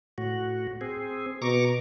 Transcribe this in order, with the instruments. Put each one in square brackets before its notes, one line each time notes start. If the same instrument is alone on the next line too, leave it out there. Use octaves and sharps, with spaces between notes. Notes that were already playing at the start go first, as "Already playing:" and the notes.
[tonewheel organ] A2 F#4
C4 G#4
[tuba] B2 [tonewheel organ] A#5 C#6 D6